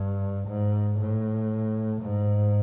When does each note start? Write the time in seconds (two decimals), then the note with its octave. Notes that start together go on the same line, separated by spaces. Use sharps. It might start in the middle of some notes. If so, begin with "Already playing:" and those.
Already playing: G2
0.48 G#2
1.00 A2
2.02 G#2